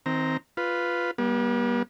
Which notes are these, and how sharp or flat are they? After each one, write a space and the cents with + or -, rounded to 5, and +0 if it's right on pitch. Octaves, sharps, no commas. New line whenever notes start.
D#3 +35 C4 -5 A#5 -5
F4 +0 B4 +0
G3 +0 B3 -45